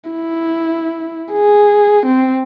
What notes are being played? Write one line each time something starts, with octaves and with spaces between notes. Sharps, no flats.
E4
G#4
C4